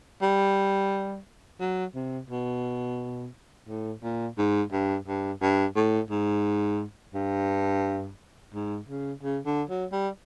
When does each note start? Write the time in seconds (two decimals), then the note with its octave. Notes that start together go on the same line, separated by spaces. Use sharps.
0.22 G3
1.60 F#3
1.95 C3
2.30 B2
3.68 A2
4.03 A#2
4.38 G#2
4.72 G2
5.07 G2
5.41 G2
5.76 A2
6.10 G#2
7.14 G2
8.54 G#2
8.88 C#3
9.23 C#3
9.46 D3
9.69 F#3
9.92 G3